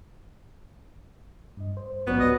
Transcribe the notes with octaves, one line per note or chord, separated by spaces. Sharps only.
G2 D#5
C5
A1 G#2 F#3 B3 C#4 F#4 D5
C#2 G4 B4 D#5